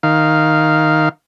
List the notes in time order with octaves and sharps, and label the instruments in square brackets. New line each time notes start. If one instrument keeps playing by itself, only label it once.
[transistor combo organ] D#3 F5